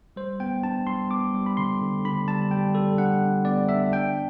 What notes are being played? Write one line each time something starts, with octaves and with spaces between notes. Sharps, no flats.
G3 C5
B3 G5
D4 A5
G3 C6
B3 D6
G3
B5
D3 C6
D3
D3 B5
G3 A5
G3 G5
G3 A4
D4 F#5
D4
B3 D5
D4 E5
D4 G5